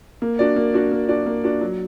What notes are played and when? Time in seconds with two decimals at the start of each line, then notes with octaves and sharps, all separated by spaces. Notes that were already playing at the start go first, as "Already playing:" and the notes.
0.22 A#3
0.39 D4 F#4 D5
0.56 A#3
0.74 D4 F#4 D5
0.92 A#3
1.09 D4 F#4 D5
1.26 A#3
1.44 D4 F#4 D5
1.61 F#3